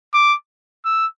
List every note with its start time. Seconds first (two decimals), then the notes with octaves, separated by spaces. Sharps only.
0.14 D6
0.85 E6